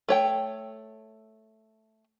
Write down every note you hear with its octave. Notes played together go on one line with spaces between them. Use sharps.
A3 C#5 G5